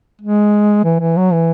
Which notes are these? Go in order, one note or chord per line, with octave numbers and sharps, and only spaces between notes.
G#3
E3
E3
F#3
E3